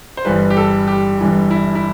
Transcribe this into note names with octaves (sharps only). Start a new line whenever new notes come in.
C5
G1 G2 E3 G3 B4
G4
A4
G4
G1 G2 E3 G3
E4
E4